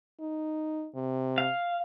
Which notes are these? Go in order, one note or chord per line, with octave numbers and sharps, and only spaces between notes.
D#4
C3
F5